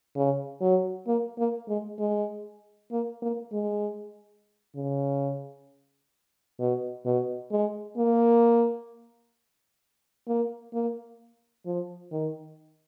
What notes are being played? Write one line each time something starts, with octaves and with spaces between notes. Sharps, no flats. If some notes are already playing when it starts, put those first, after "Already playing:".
C#3
F#3
A#3
A#3
G#3
G#3
A#3
A#3
G#3
C#3
B2
B2
G#3
A#3
A#3
A#3
F3
D#3